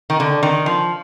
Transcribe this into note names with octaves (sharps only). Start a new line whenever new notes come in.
D#3
D3
D#3
F3